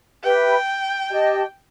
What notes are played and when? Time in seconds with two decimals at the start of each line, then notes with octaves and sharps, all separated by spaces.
0.23 G4 B4 E5 G5
1.11 G4 D#5 A5